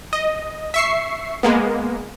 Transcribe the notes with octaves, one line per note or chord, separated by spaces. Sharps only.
D#5
E5 C#6 C7
G#3 A#3 B3